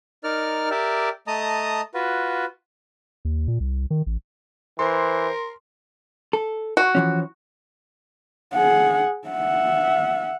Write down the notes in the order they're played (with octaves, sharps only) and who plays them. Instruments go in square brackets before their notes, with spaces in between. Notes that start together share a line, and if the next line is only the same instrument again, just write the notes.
[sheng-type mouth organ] D#4 A#4 D5 F6
G4 A#4 D5 E5
A3 D#5 A5 A#5 D#6
F4 F#4 B4
[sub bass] D#2
A#2
C2
D#3
A1
[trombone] E3 [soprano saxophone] A#4 [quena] C5 [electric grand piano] C6
[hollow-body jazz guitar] A4
[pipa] F#4
[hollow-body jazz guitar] E3 F3 C#4
[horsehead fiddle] G#4 F#5
E5 F#5